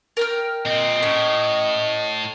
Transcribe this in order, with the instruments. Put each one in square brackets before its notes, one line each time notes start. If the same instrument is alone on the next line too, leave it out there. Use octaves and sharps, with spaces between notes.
[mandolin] A#4 G5 F6
[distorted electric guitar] A#2 C4 [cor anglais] D#5
[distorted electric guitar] A2 [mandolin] C#4